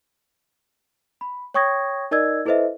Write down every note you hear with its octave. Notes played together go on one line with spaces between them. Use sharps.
B5
C#5 G5 C#6 D#6 G#6 A#6
D#4 A#4 D5 D#5 E6 G#6
E4 A4 B4 C5 D#5 E5